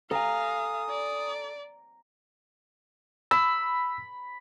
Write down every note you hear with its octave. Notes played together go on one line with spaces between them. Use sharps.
A4 F5 G#5 A#5 D#6
D5
B5 E6